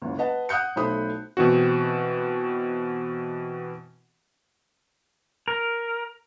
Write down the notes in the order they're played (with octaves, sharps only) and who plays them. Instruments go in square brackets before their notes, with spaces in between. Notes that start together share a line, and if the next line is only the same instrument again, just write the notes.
[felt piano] F#1 C#2
B4 D#5 F#5 A5
F#5 D#6 F#6 G6 C#7
B1 A3 E4 C5 B5 D#6
[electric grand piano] B2 E3 C4 F#4
[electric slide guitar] A#4